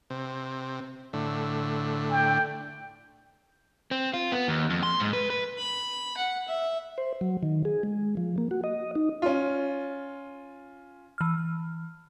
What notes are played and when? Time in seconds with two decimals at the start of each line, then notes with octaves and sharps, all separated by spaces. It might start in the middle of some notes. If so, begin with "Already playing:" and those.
0.10 C3
1.13 A2 D3
2.11 G5
3.91 C4
4.14 F4
4.32 B3
4.48 D#2
4.70 F2
4.83 C6
5.00 G#2
5.13 B4
5.30 B4
5.58 B5
6.17 F#5
6.48 E5
6.98 C5
7.21 F#3
7.43 D#3
7.65 G#4
7.83 G#3
8.17 F3
8.38 A#3
8.51 F#4
8.64 D#5
8.95 D#4
9.22 C#4 F4
11.18 E3 F6